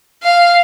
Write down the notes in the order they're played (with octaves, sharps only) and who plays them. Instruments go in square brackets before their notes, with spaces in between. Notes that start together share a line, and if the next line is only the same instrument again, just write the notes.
[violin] F5